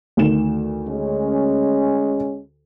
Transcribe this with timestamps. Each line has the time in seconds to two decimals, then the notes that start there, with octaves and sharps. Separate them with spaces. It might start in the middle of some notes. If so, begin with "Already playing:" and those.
0.17 D2 D#3 E7
0.88 G#3 C#4